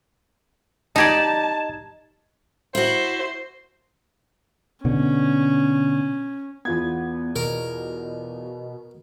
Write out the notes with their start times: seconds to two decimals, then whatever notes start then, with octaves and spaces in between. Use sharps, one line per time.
0.96 D#4 G4 D5 D#5 A5 G#6
2.75 E4 F#4 C5
4.85 B2 D3 C#4
6.65 E2 B3 F4 G#6
7.36 B2 A#4